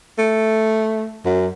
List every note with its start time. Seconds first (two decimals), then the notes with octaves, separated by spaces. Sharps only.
0.18 A3
1.25 F#2